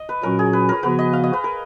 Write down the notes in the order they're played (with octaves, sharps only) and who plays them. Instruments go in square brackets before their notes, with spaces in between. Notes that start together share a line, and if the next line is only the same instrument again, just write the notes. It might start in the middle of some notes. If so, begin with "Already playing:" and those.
Already playing: [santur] D#5
B4
[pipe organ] A#2 F#3 C#4 F#4 [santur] A#4
[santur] G#4
B4
A#4
[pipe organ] C#3 F3 B3 F#4 [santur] B4
[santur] D#5
F5
D#5
B4
A#4